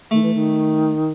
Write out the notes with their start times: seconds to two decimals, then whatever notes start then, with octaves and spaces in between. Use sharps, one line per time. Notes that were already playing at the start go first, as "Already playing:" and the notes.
0.11 D#3 A3
0.22 E3
0.34 D#3